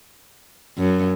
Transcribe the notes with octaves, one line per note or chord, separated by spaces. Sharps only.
F#2